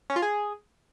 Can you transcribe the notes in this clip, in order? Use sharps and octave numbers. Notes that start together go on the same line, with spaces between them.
C#4
F4
G#4